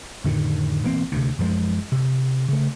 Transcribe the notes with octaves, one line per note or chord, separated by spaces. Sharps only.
F2 A2 D3 D#3
B1 E3 A#3 C4
D2 C3
F#2 F3 G#3
C3
C#3 A3